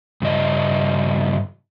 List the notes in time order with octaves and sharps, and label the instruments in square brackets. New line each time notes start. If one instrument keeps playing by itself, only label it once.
[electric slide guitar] G2 C#3 D#5